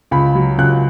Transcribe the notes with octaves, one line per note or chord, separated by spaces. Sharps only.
C#2 B5
F#3
C#2 F#6